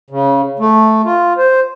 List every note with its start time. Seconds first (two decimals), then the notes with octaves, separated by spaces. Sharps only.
0.10 C#3
0.59 A3
1.05 F4
1.38 C5